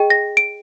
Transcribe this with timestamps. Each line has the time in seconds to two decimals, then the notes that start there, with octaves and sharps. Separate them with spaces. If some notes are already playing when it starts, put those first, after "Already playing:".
Already playing: G#4 D#5 G5
0.10 A#6
0.37 D7